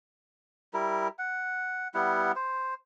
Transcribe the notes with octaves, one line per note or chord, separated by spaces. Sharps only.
G3 E4 A#4
F#5
G3 B3 E4 F#5
C5